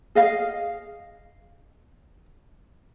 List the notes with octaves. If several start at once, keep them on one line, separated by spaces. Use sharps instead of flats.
G#4 D#5 F5